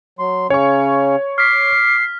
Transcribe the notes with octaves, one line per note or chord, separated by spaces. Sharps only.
F#3 C6
C#3 C#4 C#5 C#6
D6 F6 B6 C7